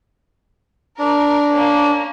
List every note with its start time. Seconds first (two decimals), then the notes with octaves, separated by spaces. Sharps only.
0.99 D4 A#4
1.50 A#3 C#4